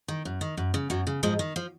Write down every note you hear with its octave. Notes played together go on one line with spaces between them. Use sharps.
D#3
F#2
D#3
F#2
C#3
F#2 F#3
C#3
G#2 F3 G#3
D#3
F3